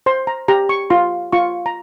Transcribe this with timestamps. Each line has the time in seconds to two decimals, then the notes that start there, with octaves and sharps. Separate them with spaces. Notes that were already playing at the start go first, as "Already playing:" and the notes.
0.06 C5 C6
0.27 A#5
0.48 G4 A#5
0.69 C#6
0.90 F4 C6
1.32 F4 C#6
1.66 A#5